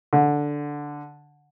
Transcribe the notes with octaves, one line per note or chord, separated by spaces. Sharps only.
D3